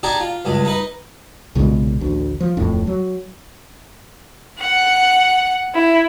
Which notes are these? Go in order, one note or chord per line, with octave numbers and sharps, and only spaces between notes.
D4 D#4 G4 D5 G#5 A#5
F4
C#2 G2 G#3
D#4 B4 D#5
B1 A#2 C#3 G#3
A1 D2
F3
D1 F2 A2
F#3
F#5
E4